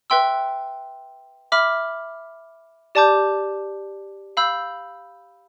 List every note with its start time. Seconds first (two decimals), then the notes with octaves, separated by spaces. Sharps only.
0.10 B4 E5 G5 C6 E6
1.52 E5 B5 D6 F6
2.95 G4 D5 A5 D6 G6
4.37 F5 B5 E6 G6